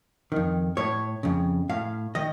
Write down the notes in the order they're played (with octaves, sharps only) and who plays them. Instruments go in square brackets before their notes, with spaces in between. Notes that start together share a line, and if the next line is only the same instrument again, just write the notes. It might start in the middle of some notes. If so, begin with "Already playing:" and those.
[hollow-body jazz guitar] F2 D#3
A2 C#5
F2 C#3
A2 F5
D#3 D#5